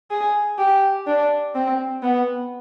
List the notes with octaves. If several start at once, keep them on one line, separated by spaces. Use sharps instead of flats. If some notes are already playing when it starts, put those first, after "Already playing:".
G#4
G4
D4
C4
B3